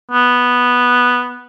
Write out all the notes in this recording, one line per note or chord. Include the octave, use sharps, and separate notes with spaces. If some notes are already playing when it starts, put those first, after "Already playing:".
B3